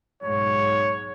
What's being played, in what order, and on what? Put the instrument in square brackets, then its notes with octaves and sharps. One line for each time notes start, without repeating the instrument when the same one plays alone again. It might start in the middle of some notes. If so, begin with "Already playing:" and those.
[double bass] B1 G#2 [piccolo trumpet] C#5